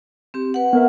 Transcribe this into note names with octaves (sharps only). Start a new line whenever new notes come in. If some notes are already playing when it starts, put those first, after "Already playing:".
C4 G4
B4 F#5
B3 A#4 E5